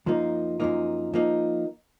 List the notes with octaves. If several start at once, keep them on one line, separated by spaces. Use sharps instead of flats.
F#2 F3 A#3 D#4
F#2 F3 A#3 D#4
F3 A#3 D#4